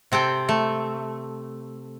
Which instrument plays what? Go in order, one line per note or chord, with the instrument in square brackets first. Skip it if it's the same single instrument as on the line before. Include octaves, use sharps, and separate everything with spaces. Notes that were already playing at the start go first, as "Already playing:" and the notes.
[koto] C3 C4 A4 G5
A3